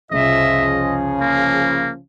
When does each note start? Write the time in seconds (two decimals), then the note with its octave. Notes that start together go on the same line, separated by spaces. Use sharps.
0.11 C2 F2 C#3 F3 D#5 E5
0.80 G#4
1.21 A#3